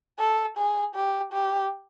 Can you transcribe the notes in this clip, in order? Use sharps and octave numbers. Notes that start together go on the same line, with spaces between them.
A4
G#4
G4
G4